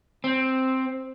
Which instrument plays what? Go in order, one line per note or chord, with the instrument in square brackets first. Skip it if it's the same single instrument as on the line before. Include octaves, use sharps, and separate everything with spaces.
[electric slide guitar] C4